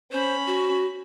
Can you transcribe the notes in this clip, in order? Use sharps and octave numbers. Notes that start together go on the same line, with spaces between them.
C#4 C5 B5
F#4